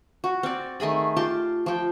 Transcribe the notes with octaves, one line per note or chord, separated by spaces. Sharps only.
F#4
C4 D5
D#3 A3 G#4 B5
F4 G4 A5 C6
F3 G5